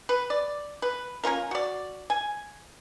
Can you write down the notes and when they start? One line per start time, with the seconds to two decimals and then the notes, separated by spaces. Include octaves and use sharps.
0.09 B4
0.30 D5
0.82 B4
1.24 A#3 C#4 F4 A#4
1.51 F#4 D5
2.10 G#5